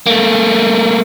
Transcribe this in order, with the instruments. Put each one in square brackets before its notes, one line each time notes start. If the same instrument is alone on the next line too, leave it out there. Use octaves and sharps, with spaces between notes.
[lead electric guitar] A3 A#3